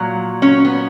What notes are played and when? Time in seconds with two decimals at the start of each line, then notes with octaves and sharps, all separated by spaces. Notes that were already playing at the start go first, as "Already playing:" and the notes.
Already playing: A#2 F#3
0.42 C#4
0.65 B3